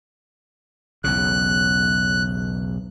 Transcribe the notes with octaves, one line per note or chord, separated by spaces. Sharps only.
B1 E2 C#3 F#6